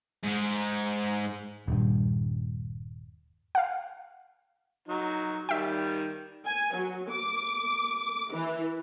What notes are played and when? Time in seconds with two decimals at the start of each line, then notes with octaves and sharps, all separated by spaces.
0.23 G#2 G#3
1.68 D#1 G2
3.55 F5 F#5
4.88 F#3 D#4
5.49 D#3 G3 E5 G5
6.46 G#5
6.75 F#3
7.10 D6
8.31 E3